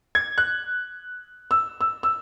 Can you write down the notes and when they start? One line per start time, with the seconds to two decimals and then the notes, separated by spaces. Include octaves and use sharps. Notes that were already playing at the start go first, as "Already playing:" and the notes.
0.15 G#6
0.38 F#6
1.51 E6
1.81 E6
2.03 E6